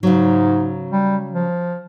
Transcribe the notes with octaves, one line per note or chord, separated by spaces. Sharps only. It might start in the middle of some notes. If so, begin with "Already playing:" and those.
G#2 C#3 F#3
G3
F3